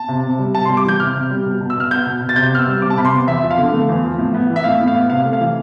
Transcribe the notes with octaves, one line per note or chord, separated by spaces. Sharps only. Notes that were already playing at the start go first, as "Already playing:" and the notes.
Already playing: A5
C3
C3
G3
C3 A5
C6
G3
D6
E3 G6
C3 F6
C3
G3
B2
B2
E6
B3 F6
B3 G6
B2
B2
A6
C3 G6
B3 F6
E6
G3
C3 D6
A5
C3 B5
C6
B3
E2 E5
F3
F5
D3
A3
E2
F3
A2
B3
E3
E5
A2 F5
A2
F5
B3
C3 F5
A3
F5
E3